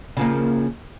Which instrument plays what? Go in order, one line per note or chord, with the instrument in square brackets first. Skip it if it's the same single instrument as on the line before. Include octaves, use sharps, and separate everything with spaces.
[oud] C#3 F3 A#3